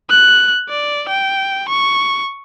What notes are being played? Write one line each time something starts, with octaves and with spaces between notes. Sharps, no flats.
F#6
D5
G5
C#6